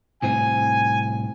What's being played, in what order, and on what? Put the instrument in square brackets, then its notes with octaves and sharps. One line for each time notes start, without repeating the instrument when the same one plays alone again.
[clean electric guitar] C2 A2 C4 [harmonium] G#5